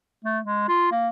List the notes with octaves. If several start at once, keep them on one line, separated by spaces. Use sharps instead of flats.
A3
G#3
F4
A#3